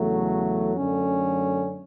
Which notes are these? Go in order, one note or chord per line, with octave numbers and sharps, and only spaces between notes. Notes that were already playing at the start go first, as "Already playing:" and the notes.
Already playing: E2 C#3 F#3 A3
F#2 D3 A3 C#4